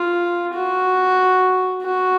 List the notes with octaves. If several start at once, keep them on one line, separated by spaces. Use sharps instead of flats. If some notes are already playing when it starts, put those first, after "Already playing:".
Already playing: F4
F#4
F#4